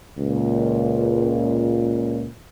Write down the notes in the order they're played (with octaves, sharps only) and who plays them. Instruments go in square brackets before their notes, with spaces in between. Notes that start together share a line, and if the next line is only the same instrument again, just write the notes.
[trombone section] C#2 A#2